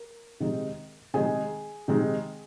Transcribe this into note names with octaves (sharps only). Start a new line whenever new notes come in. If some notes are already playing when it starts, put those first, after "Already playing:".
Already playing: A#4
C3 D#3 G#3 D#4
C3 D#3 G#3 D#4 G#4 G#5
C3 D#3 G#3 D#4